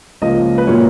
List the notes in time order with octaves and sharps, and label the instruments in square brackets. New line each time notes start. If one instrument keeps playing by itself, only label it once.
[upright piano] C#2 C#3 F3 A#3 D#5
B4
A#2 F#3 A#3 C#5